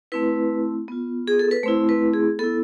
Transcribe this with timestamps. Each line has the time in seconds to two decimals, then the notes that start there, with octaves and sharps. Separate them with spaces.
0.12 A3 C4 E4 B4
0.88 B3 F4
1.27 G#4
1.39 A4
1.51 B4
1.63 A3 C4 E4 C5
1.89 B4
2.14 G#4
2.39 B3 E4 A4